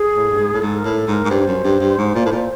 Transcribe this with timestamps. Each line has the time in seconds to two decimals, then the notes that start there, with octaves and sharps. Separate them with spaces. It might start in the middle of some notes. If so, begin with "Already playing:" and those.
Already playing: G#4
0.15 A2
0.30 G2
0.39 G#2
0.53 A2
0.61 G#2 A4
0.78 A#4
0.84 A2
0.95 A4
1.07 G#2
1.12 A#4
1.24 G#2
1.30 G2 C5
1.47 F#2
1.64 G2
1.80 G2
1.98 G#2
2.15 A#2
2.25 A2
2.32 A#2